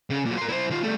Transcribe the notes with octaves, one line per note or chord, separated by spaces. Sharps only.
C#3
A#2 F#3
A#4 C6
E4 C5
D#3 F4
G3 A3